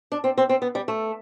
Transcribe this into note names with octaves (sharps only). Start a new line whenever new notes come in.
D4
C4
C4
C4
B3
G3
A3